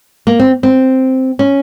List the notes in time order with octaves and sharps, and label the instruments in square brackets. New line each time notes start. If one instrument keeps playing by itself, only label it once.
[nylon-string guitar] A#3
C4
C4
C#4